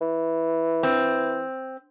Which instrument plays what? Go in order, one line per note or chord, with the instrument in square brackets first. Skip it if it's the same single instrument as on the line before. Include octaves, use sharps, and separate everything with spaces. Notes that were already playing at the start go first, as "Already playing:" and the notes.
[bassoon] E3
[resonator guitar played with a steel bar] C4